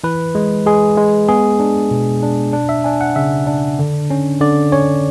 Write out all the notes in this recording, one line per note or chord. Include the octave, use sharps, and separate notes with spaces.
E3 B4
G#3
G#3 G#4
G#3
B3 G#4
D4
B2
D4
D4
E5
D4 G#5
F#5
C#3 E5
D4
D3
C#4
D3 D5
C#4 C#5